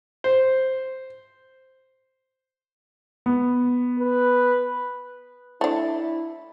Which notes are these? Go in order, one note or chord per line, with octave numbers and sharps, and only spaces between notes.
C5
B3
B4
A3 D4 E4